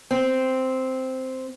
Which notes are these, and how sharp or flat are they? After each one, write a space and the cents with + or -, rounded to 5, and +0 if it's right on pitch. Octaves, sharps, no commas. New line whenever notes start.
C4 -5